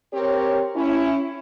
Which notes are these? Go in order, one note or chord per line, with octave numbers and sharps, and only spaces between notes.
C4 G4 A#4 C#5
C#4 E4